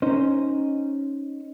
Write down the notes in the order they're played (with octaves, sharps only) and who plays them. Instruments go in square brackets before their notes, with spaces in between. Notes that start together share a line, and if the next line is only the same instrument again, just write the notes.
[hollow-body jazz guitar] C#4 D#4 C5